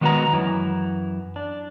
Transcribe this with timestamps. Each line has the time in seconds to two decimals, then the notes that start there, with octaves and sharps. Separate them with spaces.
0.01 D#3 G#3 B3 F#4 B4 A#5
0.33 F#2 E3
1.36 D4